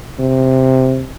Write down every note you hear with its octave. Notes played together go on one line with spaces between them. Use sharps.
C3